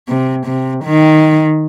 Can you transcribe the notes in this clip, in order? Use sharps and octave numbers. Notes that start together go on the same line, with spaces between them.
C3
C3
D#3